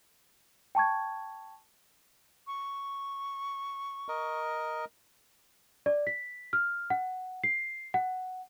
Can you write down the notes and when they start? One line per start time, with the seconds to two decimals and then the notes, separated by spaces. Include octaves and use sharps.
0.75 G5 A5 C#6 G#6
2.47 C#6
4.08 A#4 D#5
5.86 D5
6.07 B6
6.53 F6
6.90 F#5
7.44 C7
7.94 F#5